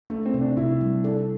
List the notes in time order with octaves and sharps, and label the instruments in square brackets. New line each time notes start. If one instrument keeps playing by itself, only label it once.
[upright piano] A3 [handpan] D4
[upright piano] C4
[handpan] C3
[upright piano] D4
[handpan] C3 [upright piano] E4
[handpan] G3
[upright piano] D4 [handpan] A4